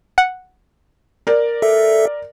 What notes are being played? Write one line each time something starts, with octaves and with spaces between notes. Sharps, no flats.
F#5
A#4 D5
A4 E5